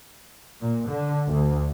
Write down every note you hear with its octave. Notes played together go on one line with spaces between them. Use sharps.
A#2
D3
D2